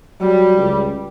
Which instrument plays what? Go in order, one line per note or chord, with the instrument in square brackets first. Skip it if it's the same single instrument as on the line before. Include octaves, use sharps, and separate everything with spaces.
[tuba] F#3 [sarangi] G3
[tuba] C#2